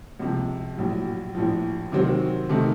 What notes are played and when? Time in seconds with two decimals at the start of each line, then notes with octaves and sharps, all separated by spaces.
0.19 C#2 C3 F3
0.77 A#1 A2 F#3
1.35 A#1 A2 F3
1.92 C3 D#3 F#3 C4 F#4
2.49 C3 D#3 A3 D#4